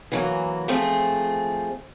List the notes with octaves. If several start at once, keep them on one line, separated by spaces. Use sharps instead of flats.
E3 F#3 A#3
F3 A3 C4 G#4